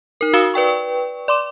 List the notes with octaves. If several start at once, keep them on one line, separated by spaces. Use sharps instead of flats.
D#4 A#4
F#4 F5 D#6 E6 C#7 E7
B4 D5 G5 C#6
D5 C6 D6 E7